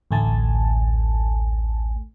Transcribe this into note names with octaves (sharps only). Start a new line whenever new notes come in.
A1 D2 A3 G#5 A5